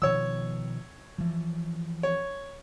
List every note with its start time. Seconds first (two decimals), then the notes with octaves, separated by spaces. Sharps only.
0.02 B2 D#3 F3 C#5 E6
1.18 E3 F3
2.03 C#5